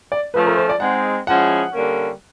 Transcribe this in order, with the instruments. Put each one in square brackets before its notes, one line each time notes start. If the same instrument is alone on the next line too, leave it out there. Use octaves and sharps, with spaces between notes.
[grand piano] D5
[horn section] F3 A3 C#4 [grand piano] B4
[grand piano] A#4
C5
D5
[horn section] G#3 C4 D#4 [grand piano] F#5
[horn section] F3 G#3 C#4 E4 G#4 [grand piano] F#5
[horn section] D3 G3 A#3 C#4